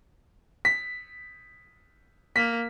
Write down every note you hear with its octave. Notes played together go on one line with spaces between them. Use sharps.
B6
A#3 B6